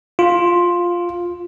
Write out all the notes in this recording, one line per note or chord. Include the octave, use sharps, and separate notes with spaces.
F4